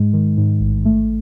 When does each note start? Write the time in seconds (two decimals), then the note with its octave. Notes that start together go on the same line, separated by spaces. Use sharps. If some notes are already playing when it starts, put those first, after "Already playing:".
Already playing: G#2 G#3
0.13 D#3
0.37 G#2
0.60 A1
0.85 A3